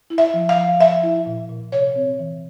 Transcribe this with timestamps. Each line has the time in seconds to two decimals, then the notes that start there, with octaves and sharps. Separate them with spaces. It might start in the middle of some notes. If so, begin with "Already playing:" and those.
0.10 E4
0.18 E5
0.34 F3
0.49 F5
0.56 F3
0.80 F3 E5
1.03 E4
1.26 A#2
1.50 A#2
1.72 C3 C#5
1.96 C4
2.19 E3